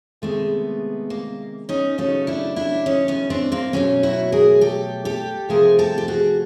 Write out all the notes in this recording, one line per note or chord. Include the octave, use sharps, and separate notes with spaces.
C3 D#3 G#3 A3 B3
A#3
C#4 D#4
C#3 F#3 A3 C#4 D#4
D4 E4
D4 E4
C#4 D#4
B3 C#4
C4 D4
A#3 C4
B2 F#3 A3 B3 C#4
E4 F#4
G#4 A#4
G4 A4
G4 A4
C3 F3 A3 G#4 A#4
G4 A4
G4
F#4 G#4